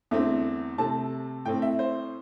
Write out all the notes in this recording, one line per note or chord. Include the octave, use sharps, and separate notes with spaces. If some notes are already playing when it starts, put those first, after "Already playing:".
E2 D3 A3 C4 E5
C3 A3 C4 A5
A2 A3 C4 G5
E5
C5